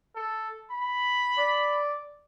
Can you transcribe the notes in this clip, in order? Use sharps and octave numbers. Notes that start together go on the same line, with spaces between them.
A4
B5
D5